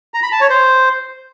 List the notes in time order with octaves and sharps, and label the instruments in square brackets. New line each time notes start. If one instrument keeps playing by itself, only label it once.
[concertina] A#5
B5
A5
C#5
C5